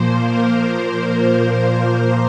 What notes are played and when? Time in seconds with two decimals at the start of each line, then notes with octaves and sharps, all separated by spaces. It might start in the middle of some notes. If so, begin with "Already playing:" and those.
Already playing: A#2 F3 A#3 C5
0.22 A#4
1.52 C5
1.95 A#4